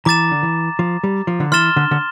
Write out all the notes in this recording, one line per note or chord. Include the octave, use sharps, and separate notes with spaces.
E3 A#5 D6 A6 E7
D3
E3
F3
G3
F3
D3
E3 C6 F6 A6 E7 G7
D3
D3